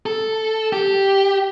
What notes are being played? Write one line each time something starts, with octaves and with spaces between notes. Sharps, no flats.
A4
G4